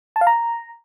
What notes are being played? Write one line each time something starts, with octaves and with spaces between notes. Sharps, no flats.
A5
F5
A#5